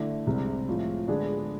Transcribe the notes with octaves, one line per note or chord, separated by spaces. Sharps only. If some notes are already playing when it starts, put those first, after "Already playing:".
Already playing: D3 A3 E4
C2 C3 G#3
A2 F3 G#3
D3 G#3 B3 D4 G#4